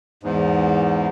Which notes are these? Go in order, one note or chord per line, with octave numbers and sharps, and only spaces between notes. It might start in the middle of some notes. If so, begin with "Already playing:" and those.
E2 G#2